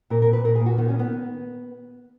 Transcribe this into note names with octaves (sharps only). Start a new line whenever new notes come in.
A#2 A#4
A#4
A#2
B4
A#2 A#4
G#4
A#2
F#4
D#3 B3
C#4
D#3
B3